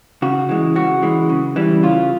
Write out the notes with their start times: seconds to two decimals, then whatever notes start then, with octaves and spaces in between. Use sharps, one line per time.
0.22 C#3 F#4
0.49 E3 G#3
0.76 C#3 F#4
1.03 E3 G#3
1.30 C#3
1.56 E3 G3
1.83 C#3 F4